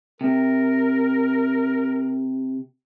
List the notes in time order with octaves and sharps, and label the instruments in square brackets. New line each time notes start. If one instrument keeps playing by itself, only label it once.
[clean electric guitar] C3 [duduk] A#4